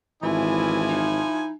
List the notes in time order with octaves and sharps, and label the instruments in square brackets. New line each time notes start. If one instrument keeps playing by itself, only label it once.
[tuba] G#1 [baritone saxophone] E3 [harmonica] F3 E4 G#5
[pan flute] D#4